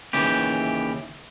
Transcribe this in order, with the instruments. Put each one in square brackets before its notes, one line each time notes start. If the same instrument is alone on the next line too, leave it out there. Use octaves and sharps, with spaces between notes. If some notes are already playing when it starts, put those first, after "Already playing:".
[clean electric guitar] D#2 C#3 E3 G4